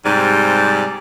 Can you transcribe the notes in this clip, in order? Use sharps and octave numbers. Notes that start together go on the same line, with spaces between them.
G#2 C3 G3